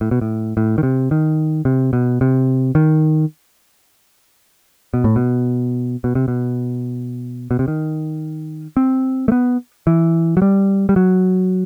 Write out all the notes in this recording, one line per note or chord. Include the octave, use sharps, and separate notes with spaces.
A2
B2
A2
A2
D#3
C3
D#3
C3
B2
C3
D#3
B2
A2
B2
B2
C3
B2
B2
C3
D#3
C4
A3
B3
E3
F#3
G3
G3
F#3